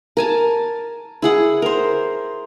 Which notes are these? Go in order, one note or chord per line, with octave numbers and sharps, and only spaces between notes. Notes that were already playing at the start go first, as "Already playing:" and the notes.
A#4 G#5 A5
E4 G#4 F#5
A#4 C5